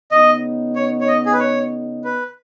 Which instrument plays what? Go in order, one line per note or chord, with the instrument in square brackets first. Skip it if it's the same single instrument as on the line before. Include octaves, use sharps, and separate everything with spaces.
[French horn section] C#3 B3 D#4 [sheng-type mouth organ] D#5
[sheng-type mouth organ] C#5
C#5
D#5
G#4
B4
C#5
B4